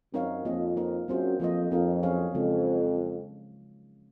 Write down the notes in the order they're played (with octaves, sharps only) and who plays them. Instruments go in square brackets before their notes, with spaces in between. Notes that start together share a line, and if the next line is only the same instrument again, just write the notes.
[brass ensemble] F#2 [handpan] C4 D#4 A#4 C#5 F5
[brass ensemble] F2 [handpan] A#3 F4 G#4 D#5
[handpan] A#3 D#4 A#4
[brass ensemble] F#2 [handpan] F#3 C4 F4 G#4 C5
[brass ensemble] F2 [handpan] F3 A#3 F4 C5 D#5
[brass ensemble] F2 [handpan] C4 D#4 A#4 F5
[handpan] F#3 C#4 G#4 C#5 F5
[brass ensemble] F2 [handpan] C#3 F3 G#3